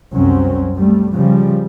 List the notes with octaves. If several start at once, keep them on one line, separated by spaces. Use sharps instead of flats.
C2 F#2 F#3 C4 C#4
G3 A3
C#3 F3 G3